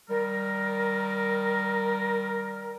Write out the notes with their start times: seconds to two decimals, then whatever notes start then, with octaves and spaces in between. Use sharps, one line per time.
0.09 D#3 G3 A#4